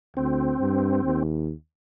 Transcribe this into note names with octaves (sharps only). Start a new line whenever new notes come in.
D2 C4
G2
D#2